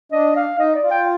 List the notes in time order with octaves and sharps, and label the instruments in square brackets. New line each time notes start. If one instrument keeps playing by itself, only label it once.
[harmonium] D4 [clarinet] D#5
[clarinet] F5
[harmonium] D#4 [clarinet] D#5
[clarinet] D5
[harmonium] F4
[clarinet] G5